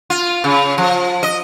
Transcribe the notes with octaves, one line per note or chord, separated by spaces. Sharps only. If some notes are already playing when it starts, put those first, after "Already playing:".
F4
C#3
F3
D#5